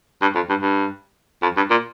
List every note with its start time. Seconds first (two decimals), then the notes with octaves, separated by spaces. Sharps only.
0.22 G2
0.35 F2
0.49 G2
0.62 G2
1.42 F2
1.57 G2
1.71 A#2